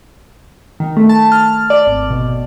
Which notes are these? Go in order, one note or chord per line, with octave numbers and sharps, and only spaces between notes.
D#3
A3
A5
F6
D5
G#1
B2